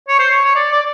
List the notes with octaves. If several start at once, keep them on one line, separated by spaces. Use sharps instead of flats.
C#5
C5
C#5
C#5
D5
D5